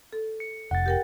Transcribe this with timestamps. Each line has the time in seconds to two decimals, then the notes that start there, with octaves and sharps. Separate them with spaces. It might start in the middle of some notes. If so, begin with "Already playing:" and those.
0.13 A4
0.40 C#7
0.71 F1 F#5 A6
0.86 G4 A#4 G5